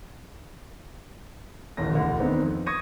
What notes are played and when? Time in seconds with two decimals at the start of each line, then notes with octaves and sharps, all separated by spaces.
1.77 D#1 A1 A#6
1.93 E1 D2
2.20 D#3 A3 B3 C4 D4 D#4
2.42 F2
2.66 C#6 D#6 G#6 A#6 C#7 D#7